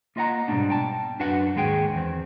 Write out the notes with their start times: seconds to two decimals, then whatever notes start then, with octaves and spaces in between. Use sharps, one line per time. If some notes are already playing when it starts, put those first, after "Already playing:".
0.16 A#3 F4 D#5 E5 F#5 A#5
0.48 G#2 B2 G3 A3 A#3 D4
0.70 G5 A5
1.19 F#2 D4 F#4 B4 F#5
1.56 D#2 G#2 G#3 G#4 G5
1.94 E2 C4